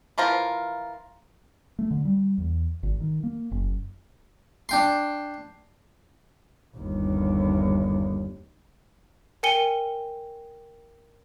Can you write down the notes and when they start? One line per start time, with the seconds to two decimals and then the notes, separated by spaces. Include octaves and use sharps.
0.18 E3 F3 F4 A#4
1.79 A3
1.91 D3
2.05 G3
2.38 E2
2.83 G#1
3.00 D#3
3.23 A#3
3.51 F#1
4.69 D4 G5 C6
6.77 G1 D#2
9.43 A#4 G5 G#5 C#7 D#7 G7